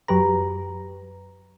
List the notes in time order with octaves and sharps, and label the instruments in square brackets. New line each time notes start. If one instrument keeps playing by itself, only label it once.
[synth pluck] F#2 F#3 G4 B4 A#5